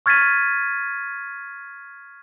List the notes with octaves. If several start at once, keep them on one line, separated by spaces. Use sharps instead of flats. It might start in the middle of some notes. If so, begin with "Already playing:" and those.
C#6 F6 G#6 A6 B6 D#7